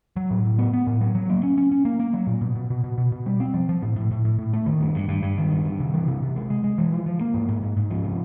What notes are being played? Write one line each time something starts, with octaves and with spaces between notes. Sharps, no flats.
F#3
A2
A2
B3
B3
A2
F#3
F#3
A#3
C#4
C#4
C#4
A#3
A#3
F#3
A#2
B2
B2
B2
B2
B2
B2
G3
C4
F3
F3
A2
A2
A2
A2
A2
A3
D#3
G2
G2
G2
G2
D#3
G2
G2
C3
E3
C3
C3
G#3
G#3
G#3
E3
F3
F3
A#3
G#2
G#2
G#2
G#2
F3
C3